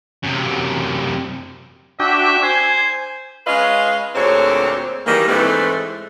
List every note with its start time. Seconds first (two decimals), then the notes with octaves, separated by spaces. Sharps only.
0.23 F#2 C3
2.00 D4 F#4 E5 G5
2.43 C5 G#5
3.47 G#3 C#4 F4 B4 D#5 F5
4.15 D2 A#2 D3 C4 G#4 C#5
5.06 D#3 E3 G3 G#3 A#3
5.28 G#2 E3 G#3 A3 C4 B4